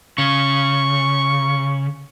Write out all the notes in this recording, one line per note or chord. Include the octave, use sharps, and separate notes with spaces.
C#3 C#6